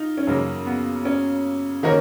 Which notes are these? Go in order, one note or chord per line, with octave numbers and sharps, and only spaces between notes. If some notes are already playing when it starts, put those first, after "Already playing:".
Already playing: D#4 F4
C#4
F#2 C#3 F#3 A#3
B3
C#4
D#3 A#3 C#4 F#4 A#4